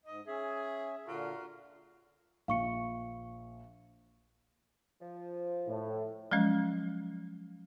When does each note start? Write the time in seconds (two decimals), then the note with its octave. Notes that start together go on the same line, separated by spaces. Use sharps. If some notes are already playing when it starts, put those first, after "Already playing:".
0.06 G#2 D#5
0.27 C#4 G#4 E5
1.07 A#2 D3 F4 F#4 A#4
2.48 A#1 F5 C#6 C#7
5.00 F3
5.67 A2
6.32 F3 F#3 G#3 C#4